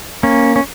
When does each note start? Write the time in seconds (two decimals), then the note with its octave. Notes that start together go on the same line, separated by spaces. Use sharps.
0.23 A#3 C#4
0.56 C#4